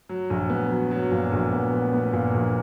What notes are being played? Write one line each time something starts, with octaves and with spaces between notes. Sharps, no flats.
F#3
A#1
B3
F#3
F#3
A#2
A#1
B3
B3
B3
A#2
A#1